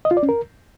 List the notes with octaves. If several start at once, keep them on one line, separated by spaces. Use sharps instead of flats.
D#5
F4
D5
C#4
A#4